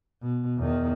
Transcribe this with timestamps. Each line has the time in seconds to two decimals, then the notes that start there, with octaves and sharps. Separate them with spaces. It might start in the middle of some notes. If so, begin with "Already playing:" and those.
0.22 B2
0.58 E2 D#3